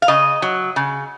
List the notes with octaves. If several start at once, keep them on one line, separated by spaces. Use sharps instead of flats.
F5
C#3 D#5
F#3
C#3